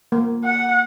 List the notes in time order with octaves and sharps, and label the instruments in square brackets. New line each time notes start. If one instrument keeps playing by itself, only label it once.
[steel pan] A#3
[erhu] F#5